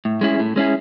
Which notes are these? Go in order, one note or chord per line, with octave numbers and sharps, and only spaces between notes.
A2
G#3 C#4 E4 G#4
A2
G#3 C#4 E4 G#4